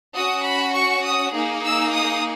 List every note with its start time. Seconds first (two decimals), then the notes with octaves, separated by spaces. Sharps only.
0.16 C#4 F#4 D#6
0.45 B5
0.75 C#6
1.04 D#6
1.34 A#3 D#4 G#4
1.63 E6
1.92 D#6